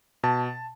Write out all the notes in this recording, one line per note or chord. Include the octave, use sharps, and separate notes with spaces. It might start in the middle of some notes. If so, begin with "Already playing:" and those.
B2 A5